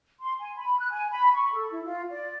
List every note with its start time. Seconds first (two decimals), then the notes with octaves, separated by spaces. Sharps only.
0.21 C6
0.39 G#5
0.56 B5
0.79 F#6
0.91 G#5
1.10 B5
1.33 C#6
1.52 A4
1.71 E4
1.84 F4
2.11 D5